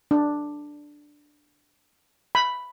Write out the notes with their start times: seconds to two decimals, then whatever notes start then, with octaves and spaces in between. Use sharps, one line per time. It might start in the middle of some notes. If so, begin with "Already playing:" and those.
0.11 D4
2.35 B5